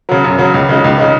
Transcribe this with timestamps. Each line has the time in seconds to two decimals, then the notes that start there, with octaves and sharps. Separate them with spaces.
0.09 C#3 F#3
0.24 F#2
0.39 C#3 F#3
0.54 C#2
0.69 C#3 G#3 D#4
0.84 C#2
0.98 C#3 G#3 D#4